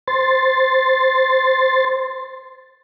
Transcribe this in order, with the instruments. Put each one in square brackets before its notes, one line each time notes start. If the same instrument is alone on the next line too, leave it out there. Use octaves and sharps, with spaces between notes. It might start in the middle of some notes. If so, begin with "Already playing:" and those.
[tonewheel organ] C5 C6 A6